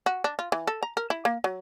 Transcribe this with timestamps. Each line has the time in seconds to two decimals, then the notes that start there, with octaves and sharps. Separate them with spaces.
0.06 F#4
0.24 D4
0.39 F4
0.52 E3
0.67 A4
0.83 A#5
0.97 A#4
1.10 E4
1.25 A#3
1.44 F#3